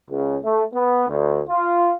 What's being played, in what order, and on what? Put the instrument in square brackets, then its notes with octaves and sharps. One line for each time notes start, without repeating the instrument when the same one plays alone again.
[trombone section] C#2
A3
B3
D2
F4